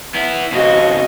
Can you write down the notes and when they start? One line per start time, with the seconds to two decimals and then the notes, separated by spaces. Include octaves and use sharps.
0.15 B3 E4
0.52 F2 C#3 F#4 D#5